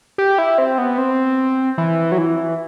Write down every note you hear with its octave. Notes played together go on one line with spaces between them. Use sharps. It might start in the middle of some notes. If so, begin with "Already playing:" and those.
G4
E4
C4
B3
C4
E3
F#3
E3